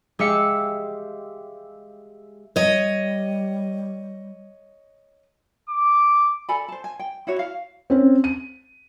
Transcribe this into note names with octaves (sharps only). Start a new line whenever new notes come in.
G#3 G4 E5 F5 E6 C#7
G3 C#5 D#5
D6
A4 D5 G#5 B5
C5 A5
G#5
G5
E4 F#4 C#5
F5
C4 C#4
D#7